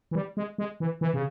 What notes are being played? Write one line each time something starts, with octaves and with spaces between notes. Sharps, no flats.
E3
G3
G#3
G#3
E3
E3
C#3